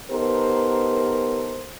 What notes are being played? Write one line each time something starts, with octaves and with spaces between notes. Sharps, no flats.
B3 D#4 G4 A4 A#4 C5